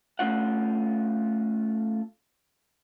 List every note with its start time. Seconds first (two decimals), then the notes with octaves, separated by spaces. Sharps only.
0.19 A3 C#4 F4 F#5